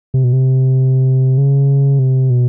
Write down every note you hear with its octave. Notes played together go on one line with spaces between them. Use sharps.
C3
B2
C3
C#3
C3
B2